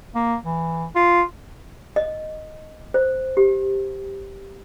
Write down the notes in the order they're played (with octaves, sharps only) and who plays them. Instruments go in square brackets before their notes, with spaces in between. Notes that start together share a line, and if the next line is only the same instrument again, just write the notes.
[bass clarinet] A#3
E3
F4
[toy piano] D#5
C5
G4